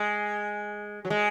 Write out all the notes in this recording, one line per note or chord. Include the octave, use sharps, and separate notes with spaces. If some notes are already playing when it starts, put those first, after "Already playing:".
Already playing: G#3
F#3
G#3